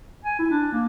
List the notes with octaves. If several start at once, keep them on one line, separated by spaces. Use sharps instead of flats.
G#5
E4
D4
A#3